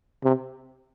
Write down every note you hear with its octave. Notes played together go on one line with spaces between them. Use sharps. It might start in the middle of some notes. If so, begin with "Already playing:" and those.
C3